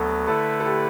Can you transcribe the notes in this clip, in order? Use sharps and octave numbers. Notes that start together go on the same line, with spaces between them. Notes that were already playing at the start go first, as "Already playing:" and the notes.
Already playing: D2 F#3 B3 A4
D3 A3 E4 A4 B4
A4
G4